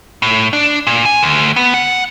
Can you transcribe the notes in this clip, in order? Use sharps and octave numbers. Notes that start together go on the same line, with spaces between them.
A2
D4
A#2
G#5
D2
B3
F#5